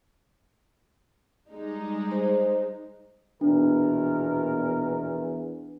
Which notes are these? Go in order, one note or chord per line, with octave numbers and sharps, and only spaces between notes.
G3 G#3 D#4
C5
A#1 E2 B2 D4 A#4